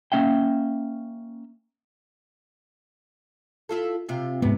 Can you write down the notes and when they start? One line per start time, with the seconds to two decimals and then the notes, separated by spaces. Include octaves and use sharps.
0.12 A#3 C#4 E5 G5
3.69 E4 F4 A4
4.09 C3 F4
4.42 G#2 C3 B3